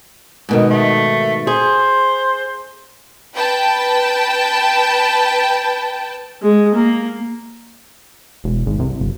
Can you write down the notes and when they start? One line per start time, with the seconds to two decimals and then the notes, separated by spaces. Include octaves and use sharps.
0.49 G#2 B2 D#3
0.70 A3
1.47 G#4 C5
3.34 B4 G5 A5
6.42 G#3
6.74 A#3
8.44 E1
8.67 G#1
8.80 C2
9.00 F#1